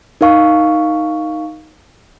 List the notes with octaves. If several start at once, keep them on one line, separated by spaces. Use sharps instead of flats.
D#4 A#4 F5 C#6